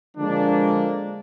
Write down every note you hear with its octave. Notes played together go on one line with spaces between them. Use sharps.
D3 F3 G#3 A#3 D4